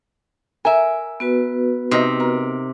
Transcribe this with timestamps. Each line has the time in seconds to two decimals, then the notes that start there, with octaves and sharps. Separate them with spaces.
0.65 A#4 E5 G#5
1.20 B3 F#4 B4
1.91 C3 D#4 D#5
2.20 A#4